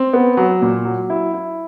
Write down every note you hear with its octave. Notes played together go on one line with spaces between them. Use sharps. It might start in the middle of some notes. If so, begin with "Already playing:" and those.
Already playing: C4
B3
F#3
A#2
F#3
E4
E4